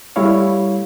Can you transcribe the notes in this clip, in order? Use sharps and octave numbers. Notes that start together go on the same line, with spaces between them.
G3 A3 E4 C#5 F5